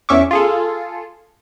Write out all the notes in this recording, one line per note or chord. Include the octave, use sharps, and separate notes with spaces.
E2 C#4 E5 C#6 D6
F4 G#4 A4